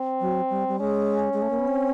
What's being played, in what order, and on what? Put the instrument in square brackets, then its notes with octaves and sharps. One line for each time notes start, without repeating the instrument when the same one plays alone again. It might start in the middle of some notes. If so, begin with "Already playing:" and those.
Already playing: [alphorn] C4
[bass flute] F#3
G3
G3
[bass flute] G#3 [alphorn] C#4
[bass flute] G#3
A3
A#3
B3
C4